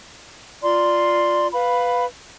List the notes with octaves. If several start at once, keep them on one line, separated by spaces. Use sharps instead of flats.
F4 D5 A#5 C6
B4 F5 B5